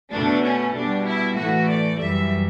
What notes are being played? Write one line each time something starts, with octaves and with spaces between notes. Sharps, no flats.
B2 A3 D4
C#4
B2 G3 D4
E4
A2 E3 A3 F#4
D5
F#2 E3 G3 E5